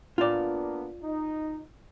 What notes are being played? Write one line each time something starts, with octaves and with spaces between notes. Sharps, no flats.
A#3 B3 D4 F4 D5
D#4